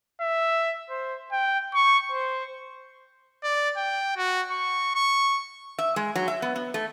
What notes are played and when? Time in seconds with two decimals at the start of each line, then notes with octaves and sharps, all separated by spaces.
0.21 E5
0.90 C5
1.32 G5
1.74 C#6
2.11 C5
3.43 D5
3.77 G5
4.17 F#4
4.51 C#6
4.95 C#6
5.79 E5
5.96 G#3
6.16 F#3
6.28 E5
6.42 B3
6.56 B3
6.74 A3